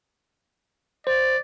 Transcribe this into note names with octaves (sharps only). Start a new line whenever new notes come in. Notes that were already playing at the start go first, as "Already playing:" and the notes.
C5 D5